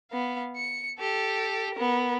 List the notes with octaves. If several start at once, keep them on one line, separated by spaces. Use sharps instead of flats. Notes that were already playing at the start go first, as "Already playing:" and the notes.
B3 F5
C#7
G4 A4
B3 A#4